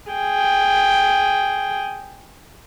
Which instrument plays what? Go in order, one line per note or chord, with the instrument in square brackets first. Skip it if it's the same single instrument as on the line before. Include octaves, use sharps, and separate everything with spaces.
[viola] G#4 G5